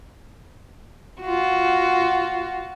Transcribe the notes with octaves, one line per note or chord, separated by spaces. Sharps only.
F4 F#4